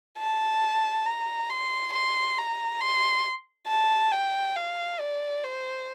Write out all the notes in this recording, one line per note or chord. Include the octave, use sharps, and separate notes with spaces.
A5
A#5
C6
C6
A#5
C6
A5
G5
F5
D5
C5